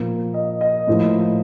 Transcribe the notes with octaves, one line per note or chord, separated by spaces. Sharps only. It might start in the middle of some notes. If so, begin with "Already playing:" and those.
Already playing: A#2 F3 A#3
D#5
D#5
A2 F3 A#3